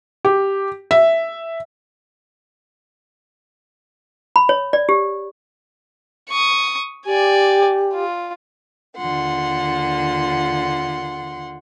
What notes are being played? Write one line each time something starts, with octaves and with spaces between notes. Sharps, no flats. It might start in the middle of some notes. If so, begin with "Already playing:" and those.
G4
E5
B5
C#5
D5
G4
C#6 D#6
G4 D5 G#5
F4
D#2 D3 F4 F#5 C6